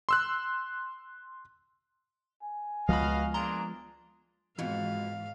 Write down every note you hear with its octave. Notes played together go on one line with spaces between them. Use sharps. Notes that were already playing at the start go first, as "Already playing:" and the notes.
C6 E6 F#6
G#5
C#2 F3 G#3 B3 F#4 D#5 F5 B5
A#3 D4 G#4 A#5 C6
F2 G#2 B2 E3 E4 F5